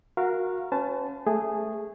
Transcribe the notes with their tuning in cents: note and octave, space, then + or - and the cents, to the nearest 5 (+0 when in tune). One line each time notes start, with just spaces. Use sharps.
F#4 -20 A#4 +0 F5 -20
C#4 +0 B4 +40 A5 -5
A3 +0 G#4 -10